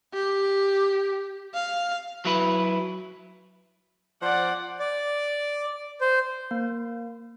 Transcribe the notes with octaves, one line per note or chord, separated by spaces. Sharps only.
G4
F5
F#3 E4 B4
F3 C5 D5 F#5
D5
C5
A#3